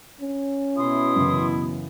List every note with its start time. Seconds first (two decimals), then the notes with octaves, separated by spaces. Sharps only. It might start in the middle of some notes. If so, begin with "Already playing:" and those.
0.21 C#4
0.77 B2 E4 C6 D#6
1.16 F#2 C#3 E3